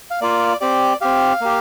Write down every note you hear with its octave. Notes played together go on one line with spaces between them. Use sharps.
F5
A#3 F4 D5
C4 G4 D5
C4 G4 F5
A#3 G4